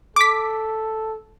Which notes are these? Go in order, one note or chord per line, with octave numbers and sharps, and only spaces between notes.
A4 D6 B6